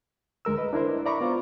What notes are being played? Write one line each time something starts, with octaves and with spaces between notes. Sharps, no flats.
D2 G#3 A#4 E6
B4 D#5
D4 E4 A#4 C5
D5 E5 A#5 B5 C#6 D6
B3 F4 C5